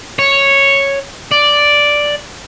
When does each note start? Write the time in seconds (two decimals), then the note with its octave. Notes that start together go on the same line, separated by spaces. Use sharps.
0.19 C#5
1.31 D5